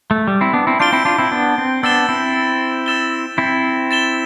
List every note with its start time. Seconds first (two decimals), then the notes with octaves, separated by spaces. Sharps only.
0.11 A3
0.27 G3
0.41 C4 E4
0.53 B3 D4
0.67 C4 E4
0.79 D4 F4 G6 D7 G7
0.93 C4 E4
1.05 D4 F4
1.18 C4 E4
1.31 B3 D4
1.58 C4
1.83 B3 D4 E6 A6 E7 G7
2.09 C4 E4
2.86 E6 A6 E7 G7
3.38 C4 E4
3.91 A6 E7 G7